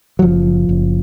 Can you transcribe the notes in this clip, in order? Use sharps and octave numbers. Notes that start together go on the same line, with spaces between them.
F#3
F#1 F3
F#1